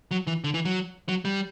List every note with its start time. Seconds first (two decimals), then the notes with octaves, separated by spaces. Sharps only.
0.11 F#3
0.27 E3
0.44 D3
0.54 E3
0.65 F#3
1.09 F#3
1.25 G3